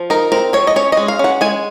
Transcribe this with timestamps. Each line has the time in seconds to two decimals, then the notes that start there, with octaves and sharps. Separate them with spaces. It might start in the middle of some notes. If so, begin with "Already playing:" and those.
Already playing: F3
0.10 D#4 A#4
0.32 C4 A#4
0.53 F3 C#5
0.67 D#5
0.76 C#4 C#5
0.92 G#3 D#5
1.08 F5
1.19 C#4 F#5
1.41 G#3 G#5